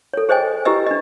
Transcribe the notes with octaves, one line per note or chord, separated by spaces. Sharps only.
A4 C#5
G#4 C5 C#5 D#5 G5 G#5
E4 G4 B4 D#5 E6
D4 D#5